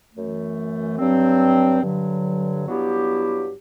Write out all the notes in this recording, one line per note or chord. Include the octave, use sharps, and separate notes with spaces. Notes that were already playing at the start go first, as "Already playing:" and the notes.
F#2 E3 A3
G2 F#3 C4
G2 D3 F#3
G2 F#3 B3 E4 G4